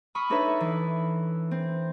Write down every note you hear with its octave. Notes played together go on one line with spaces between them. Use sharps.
B5 C#6 D#6 F6
D4 D#4 A4 B4 C#5 E5
E3
C4